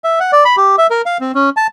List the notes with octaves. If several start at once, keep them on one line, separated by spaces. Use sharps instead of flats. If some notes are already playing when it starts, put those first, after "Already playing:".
E5
F#5
D5
B5
G4
E5
A#4
F5
C4
C#4
A5